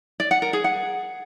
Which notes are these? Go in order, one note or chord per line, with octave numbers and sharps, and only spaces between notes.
D5
F#5
A#4
G#4
F#5